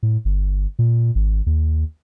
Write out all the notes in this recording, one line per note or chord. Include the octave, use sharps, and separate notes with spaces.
A2
G1
A#2
G#1
D#2